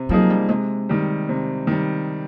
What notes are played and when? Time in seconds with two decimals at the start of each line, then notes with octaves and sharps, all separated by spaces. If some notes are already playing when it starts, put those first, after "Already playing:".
Already playing: C3
0.09 F3 F#3 A#3 D#4 G#4
0.30 G3
0.49 C3 G#3
0.89 D#3 G3
1.29 C3
1.67 D#3 G3